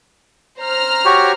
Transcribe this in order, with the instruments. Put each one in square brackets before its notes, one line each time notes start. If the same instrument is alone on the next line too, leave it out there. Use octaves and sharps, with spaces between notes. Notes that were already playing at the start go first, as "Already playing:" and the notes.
[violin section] C5 A#5 F6
[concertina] F#4 G4 C#5